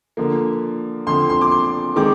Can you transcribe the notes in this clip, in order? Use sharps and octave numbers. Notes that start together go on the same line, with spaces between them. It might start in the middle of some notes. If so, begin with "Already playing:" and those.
D3 F3 A#3
D3 F3 C4 C6
C6
D6
C6
D#3 G#3 C4 D6